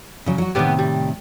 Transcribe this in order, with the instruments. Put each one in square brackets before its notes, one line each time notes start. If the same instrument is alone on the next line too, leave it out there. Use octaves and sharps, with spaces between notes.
[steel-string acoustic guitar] C#3 F#3
F#3 F#4
[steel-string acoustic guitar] A2 C3 D#3 [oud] G3 B3 G4
[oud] G3